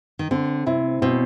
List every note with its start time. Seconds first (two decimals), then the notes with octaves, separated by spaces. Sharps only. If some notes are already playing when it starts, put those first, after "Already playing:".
0.19 D#3
0.31 D3 C4
0.66 C3 E4
1.02 B2 C4